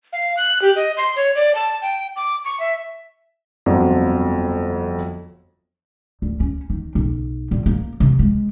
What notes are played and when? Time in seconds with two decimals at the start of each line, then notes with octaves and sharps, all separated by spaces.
0.13 F5
0.37 F#6
0.62 G4
0.76 D#5
0.97 C6
1.16 C#5
1.35 D5
1.55 A5
1.82 G5
2.16 D6
2.45 C#6
2.60 E5
3.66 G1 F2 F3 F#3
6.22 D2
6.40 C#4
6.70 D#3
6.95 B1
7.51 A#2
7.66 A#3
8.00 C3
8.19 G#3